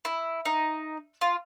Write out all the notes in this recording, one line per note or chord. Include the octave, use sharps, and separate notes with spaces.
E4
D#4
F4